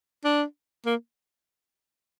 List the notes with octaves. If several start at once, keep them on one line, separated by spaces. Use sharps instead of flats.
D4
A#3